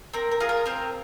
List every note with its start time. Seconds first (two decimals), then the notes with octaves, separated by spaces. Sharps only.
0.13 C4 A#4
0.31 A#4
0.40 F4 G#4
0.49 A#4
0.65 C4 A#4